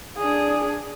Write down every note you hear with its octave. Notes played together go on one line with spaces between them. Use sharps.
D4 G#4